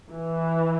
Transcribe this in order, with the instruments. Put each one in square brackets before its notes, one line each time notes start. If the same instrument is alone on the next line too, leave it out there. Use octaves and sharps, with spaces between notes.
[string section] E3